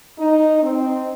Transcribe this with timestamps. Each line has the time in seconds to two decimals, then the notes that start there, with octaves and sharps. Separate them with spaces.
0.18 D#4
0.62 C4